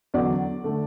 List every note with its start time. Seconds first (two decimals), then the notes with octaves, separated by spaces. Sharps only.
0.14 E2 D3 F#3 D5
0.64 D3 A3